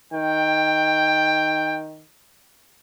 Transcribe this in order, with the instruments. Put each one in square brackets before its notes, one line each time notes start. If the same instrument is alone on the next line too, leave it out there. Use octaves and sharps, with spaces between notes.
[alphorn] D#3 [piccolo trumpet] G5